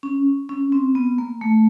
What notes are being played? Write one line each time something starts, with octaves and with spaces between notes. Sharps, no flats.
C#4
C#4
C4
B3
A#3
A3